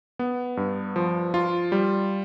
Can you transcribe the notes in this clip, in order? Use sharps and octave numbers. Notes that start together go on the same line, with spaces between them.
B3
G2
F3
F4
G3